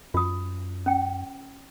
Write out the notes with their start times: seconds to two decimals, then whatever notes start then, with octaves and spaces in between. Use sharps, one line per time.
0.14 F#2 F4 D#6
0.86 C#4 G5